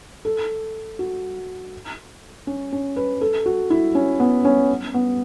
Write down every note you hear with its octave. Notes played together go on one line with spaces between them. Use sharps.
A4
F#4
C#4
C#4
B4
A4
F#4
E4
C#4
B3
C#4
B3